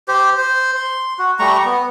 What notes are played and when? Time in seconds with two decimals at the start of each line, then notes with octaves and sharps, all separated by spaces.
0.08 G4 C5
0.38 C5
0.75 C6
1.19 F#4
1.39 G3 A3 A#5 C#6
1.65 B3